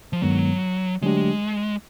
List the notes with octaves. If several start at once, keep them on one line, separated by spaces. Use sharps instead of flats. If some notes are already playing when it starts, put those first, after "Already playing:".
F3
G2 D#3 F#3 G#3 B3
D3 F#3 G#3 A3 D4 G4